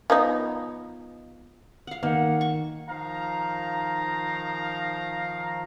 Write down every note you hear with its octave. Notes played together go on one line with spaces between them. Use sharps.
F3 B3 D#4
F5 F#5
D#3 A#3 F#5
C#6
D#3 F3 F5 A#5